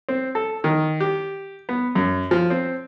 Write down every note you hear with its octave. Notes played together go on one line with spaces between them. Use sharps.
C4
A4
D#3
G4
B3
F#2
F3
C4